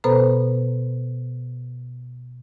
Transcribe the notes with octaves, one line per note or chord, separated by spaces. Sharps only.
B2 B3 A4 B4 C5 A#5